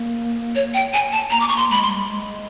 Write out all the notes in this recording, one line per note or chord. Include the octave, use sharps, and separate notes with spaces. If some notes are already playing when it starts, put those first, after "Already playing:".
Already playing: A#3
C#5
G5
G#5
A5
A#3 A#5
D6
A#3 C#6
C6
G#3 B5
C6
G3
G#3